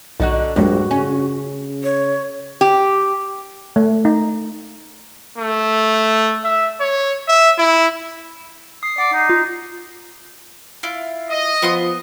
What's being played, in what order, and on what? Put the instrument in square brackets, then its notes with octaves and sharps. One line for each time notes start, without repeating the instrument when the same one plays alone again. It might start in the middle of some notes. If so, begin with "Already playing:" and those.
[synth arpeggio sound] B1 [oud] D3 D#4 F#4
[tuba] A#1 [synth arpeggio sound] E2 F#3 G#3 [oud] G2 [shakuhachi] F#4
[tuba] C#3 [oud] C#4
[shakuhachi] C#5
[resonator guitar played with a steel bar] G4
[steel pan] A3
D#4
[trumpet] A3
E5
C#5
E5
E4
[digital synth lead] D#6 [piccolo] C7
[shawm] D5 [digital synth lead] F#5
[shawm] D#4
[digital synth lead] F4
[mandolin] E4 F4
[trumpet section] D#5
[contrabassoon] F3 [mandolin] B3 C6 D#6